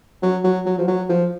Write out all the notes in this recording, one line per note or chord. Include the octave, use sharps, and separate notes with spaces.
F#3
F#3
F#3
F3
F#3
F3